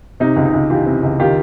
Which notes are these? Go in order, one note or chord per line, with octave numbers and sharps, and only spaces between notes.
C3 D#4
C#2
D#4
C#2
E3 F4 G4
C3
C#2
D#3 F4 G4